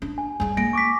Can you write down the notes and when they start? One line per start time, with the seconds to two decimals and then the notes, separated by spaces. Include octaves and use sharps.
0.02 D4
0.18 G#5
0.40 G3 G#3 G#5
0.57 A#3 A#6 D7
0.73 C#6 D6 B6